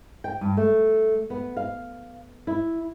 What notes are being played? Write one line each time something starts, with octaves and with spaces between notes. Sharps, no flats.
G5
G2
A3
B3
F5
E4